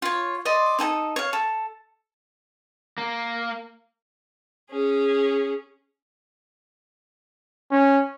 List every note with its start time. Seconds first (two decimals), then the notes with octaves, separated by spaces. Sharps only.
0.02 F4 C#5
0.45 D5 D#5 C6
0.79 D#4 A4 G#5 D#6
1.16 C#5 F5
1.33 A4
2.98 A#3
4.70 C#4 G#4
7.71 C#4